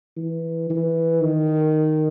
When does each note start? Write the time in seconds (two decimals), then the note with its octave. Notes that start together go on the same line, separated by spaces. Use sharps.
0.17 E3
0.70 E3
1.22 D#3